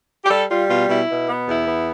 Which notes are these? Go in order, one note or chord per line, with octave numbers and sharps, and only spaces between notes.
G4
G3 A4
G3 F4
B2 F4
B2 E4
B2
B3
E2 E4
B3